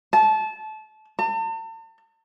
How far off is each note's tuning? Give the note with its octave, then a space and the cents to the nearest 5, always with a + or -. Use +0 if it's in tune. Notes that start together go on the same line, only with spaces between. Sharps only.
A5 -25
A5 +40